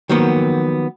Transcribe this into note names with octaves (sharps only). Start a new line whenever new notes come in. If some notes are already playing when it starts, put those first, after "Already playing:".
D#3 F3 F#3 A#3 B3